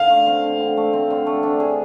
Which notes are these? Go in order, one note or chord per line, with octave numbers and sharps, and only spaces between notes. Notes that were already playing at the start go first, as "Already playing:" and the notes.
Already playing: D3 F5
A3
C4
D3
D3
A3
C4
D3
A3
D4
G#4